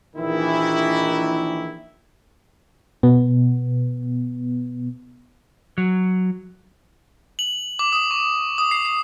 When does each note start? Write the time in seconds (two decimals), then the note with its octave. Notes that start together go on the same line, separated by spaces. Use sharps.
0.16 A#1 D#3 E3 E4
3.03 B2 B3
5.78 F#3
7.39 F#7
7.79 D6
7.93 D#6
8.11 C#6
8.58 D#6
8.71 C7
8.85 C7